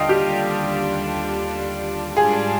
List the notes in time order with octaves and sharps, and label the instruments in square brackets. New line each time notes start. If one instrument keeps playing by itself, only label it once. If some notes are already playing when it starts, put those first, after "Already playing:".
Already playing: [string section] D#2 D3 G3 D4 F4 [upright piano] D#5 F5 G5
[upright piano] G4
[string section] G#2 G3 D4 F4 [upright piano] G#4